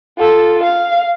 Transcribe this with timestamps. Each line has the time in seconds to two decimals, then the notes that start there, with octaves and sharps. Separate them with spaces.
0.18 F4 A4
0.63 F5